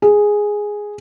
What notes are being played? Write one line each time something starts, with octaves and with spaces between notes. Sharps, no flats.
G#4